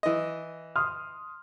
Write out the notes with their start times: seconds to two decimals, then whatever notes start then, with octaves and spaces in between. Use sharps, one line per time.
0.03 E3 D#5
0.76 C6 D#6 F6